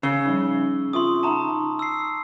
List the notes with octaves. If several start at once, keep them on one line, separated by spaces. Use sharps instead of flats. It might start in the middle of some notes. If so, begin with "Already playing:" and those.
C#3 E6 G7
F3 G3 D#4
C4 F4 E5 C6 C#6 D#6
D#4 E5 F#5 A5 A#5
E6 C7